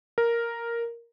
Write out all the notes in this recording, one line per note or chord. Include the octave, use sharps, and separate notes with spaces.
A#4